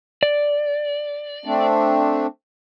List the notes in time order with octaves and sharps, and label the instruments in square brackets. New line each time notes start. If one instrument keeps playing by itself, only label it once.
[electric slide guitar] D5
[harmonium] A3 C4 D4